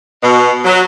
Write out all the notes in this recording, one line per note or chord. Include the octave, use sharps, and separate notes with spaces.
B2
F#3